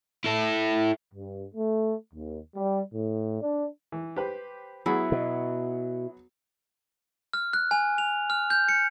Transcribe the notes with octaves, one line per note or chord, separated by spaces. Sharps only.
E4 A4
G2
A3
D#2
G3
A2
D4
E3
G4 B4 C5
F#3 B3 E4 G#4
B2
F6
F#6
G#5
F7
F6
G6
C#7